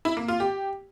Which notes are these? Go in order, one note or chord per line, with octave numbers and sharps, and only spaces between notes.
E4
A#3
F4
G4